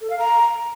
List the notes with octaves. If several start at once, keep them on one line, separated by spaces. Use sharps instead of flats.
A4
F5
A#5